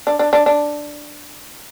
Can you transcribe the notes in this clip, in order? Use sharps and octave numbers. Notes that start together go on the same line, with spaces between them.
D4
D4
D4
D4